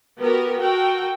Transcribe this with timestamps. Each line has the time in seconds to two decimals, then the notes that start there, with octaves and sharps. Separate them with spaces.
0.19 B3 F#4 G4 A#4
0.60 F#4 A4 A#4 G5